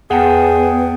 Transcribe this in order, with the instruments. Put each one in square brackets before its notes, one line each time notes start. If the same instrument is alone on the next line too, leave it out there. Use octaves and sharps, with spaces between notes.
[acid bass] E2 [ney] B3 [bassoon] G#4 [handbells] F#5 G5 A5